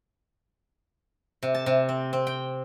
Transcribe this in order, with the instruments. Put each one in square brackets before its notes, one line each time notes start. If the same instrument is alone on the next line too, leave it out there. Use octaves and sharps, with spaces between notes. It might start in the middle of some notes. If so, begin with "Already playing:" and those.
[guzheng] C3
A5
C3
C4
C4
G5